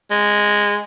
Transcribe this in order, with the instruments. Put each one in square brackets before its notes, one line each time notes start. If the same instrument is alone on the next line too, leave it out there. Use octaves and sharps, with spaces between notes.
[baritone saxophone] G#3